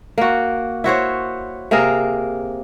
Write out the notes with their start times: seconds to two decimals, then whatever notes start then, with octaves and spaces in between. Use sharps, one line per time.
0.18 A#3 F#4
0.84 E4 F#4 C5 C#5
1.71 C3 A#3 G#4 A#4